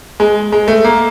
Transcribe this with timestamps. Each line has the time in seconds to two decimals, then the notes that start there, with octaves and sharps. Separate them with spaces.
0.20 G#3
0.52 G#3
0.68 A3
0.84 A#3